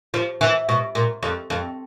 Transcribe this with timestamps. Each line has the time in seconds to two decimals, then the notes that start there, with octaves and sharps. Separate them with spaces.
0.14 F3
0.41 E3
0.69 B2
0.95 A#2
1.23 F2
1.50 F2